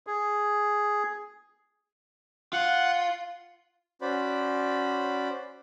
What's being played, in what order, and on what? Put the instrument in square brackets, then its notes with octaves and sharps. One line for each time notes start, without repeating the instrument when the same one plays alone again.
[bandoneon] G#4
[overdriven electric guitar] F4 [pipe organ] F#5
[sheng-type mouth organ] C#4 F#4 C5 D5 B5